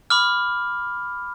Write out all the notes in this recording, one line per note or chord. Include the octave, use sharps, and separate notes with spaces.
B5 D6 F6